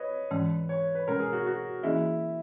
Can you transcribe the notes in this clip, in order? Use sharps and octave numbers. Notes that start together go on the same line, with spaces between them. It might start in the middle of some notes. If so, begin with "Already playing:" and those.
Already playing: B4 C#5 D#5
G#2 E3 G#3 C#4
C#5
B4
B2 G#3 C#4 A#4
G#4
F#4
F#4
E3 A#3 C#4 E4 G#4 D#5